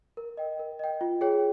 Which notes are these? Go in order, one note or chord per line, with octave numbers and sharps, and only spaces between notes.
A#4
D#5 G5
A#4
D#5 G5
F4
G#4 C#5 G5